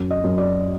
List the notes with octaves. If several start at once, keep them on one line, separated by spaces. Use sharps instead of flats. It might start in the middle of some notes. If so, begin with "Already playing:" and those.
Already playing: F#2
D#5
F#2
D5